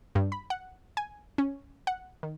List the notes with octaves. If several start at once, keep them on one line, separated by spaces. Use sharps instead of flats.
G2
B5
F#5
G#5
C#4
F#5
D#3